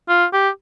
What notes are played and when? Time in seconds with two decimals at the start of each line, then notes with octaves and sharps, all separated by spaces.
0.09 F4
0.33 G4